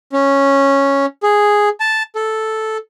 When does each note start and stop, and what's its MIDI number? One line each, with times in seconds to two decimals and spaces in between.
0.13 1.06 61
1.23 1.69 68
1.80 2.03 81
2.15 2.77 69